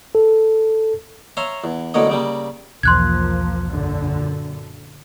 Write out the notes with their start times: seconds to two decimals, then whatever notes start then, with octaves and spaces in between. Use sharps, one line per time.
0.15 A4
1.37 C#5 E5 F5 A#5 C6
1.64 E2
1.94 B1 A2 D3 A#3 C#5 D#5
2.10 C#3 G3 A#3
2.83 B1 E2 F3 A#3 C6 F#6 G#6
3.69 F#2 A#2 D3